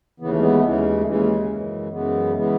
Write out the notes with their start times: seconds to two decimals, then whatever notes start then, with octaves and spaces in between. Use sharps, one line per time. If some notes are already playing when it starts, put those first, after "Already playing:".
0.20 D#2 C#3 E3 B3
0.30 A3
0.40 G#3 B3
0.53 A3
0.63 D#2 C#3 E3 G#3
1.01 A3
1.06 D#2 C#3 E3 G#3
1.50 F#2 C#3 E3
1.92 F#2 C#3 E3 G#3 B3
2.35 C#3 E3 G#3 B3